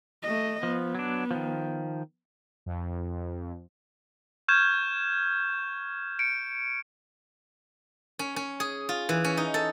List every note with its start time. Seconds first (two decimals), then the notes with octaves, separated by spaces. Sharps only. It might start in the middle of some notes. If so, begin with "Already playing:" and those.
0.23 A3 D#5
0.63 F3 B3
0.95 F#3 D4
1.31 D#3 F3
2.66 F2
4.48 C#6 F6 G6 G#6 E7
6.19 C#7 D7
8.19 C#4
8.36 C#4
8.60 G#4
8.89 F4
9.09 E3
9.24 C#4
9.37 D#4
9.54 A4